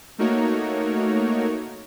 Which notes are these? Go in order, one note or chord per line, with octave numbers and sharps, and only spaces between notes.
A3 A#3 D#4 F#4 A#4 C#5